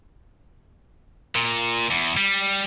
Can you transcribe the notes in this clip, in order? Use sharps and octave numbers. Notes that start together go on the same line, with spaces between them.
A#2
E2
G3